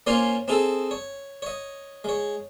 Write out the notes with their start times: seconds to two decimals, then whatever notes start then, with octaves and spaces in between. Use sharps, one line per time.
0.07 A#3 C#4 F4 C5 C#5 G#5
0.48 C4 D#4 G#4 A4
0.91 C#5
1.42 C#5 D#5
2.04 G#3 C#5